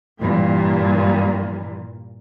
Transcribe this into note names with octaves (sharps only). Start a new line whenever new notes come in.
G2 A#2 E3